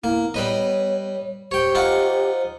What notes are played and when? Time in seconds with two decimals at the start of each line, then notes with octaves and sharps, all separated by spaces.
0.04 A#3 B3 E4
0.34 G3 B4 C#5 D#5
1.51 G4 C5 C#5 G5
1.75 D#4 F4 F#5